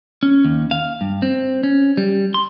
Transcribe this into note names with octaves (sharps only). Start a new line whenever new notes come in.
C#4
D#2
F5
G2
C4
C#4
G3
C6